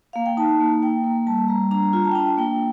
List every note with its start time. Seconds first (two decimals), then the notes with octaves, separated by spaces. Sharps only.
0.13 A#3 F5
0.26 G5
0.37 D#4 A5
0.60 A#3
0.82 A#3 G5
1.04 A#3
1.27 G3 A5
1.48 G3 A#5
1.71 D4 A#5
1.83 A#5
1.93 F4 A#5
2.05 A5
2.11 G5
2.15 D4 A5
2.37 A#3 G5